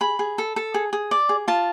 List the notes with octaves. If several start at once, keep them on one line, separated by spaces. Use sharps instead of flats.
G#4 B5
G#4
A4
A4
G#4
G#4
D5
G#4
F4 A5